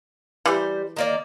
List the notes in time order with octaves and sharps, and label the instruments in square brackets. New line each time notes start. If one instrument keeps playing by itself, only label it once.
[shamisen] E3 [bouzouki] G3 C5
[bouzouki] D#3 A#3 D5